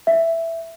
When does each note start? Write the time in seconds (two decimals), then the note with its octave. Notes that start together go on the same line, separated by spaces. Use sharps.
0.07 E5